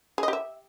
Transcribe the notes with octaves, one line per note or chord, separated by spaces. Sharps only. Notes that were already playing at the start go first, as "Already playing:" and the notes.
G#4
D#5
G4
E5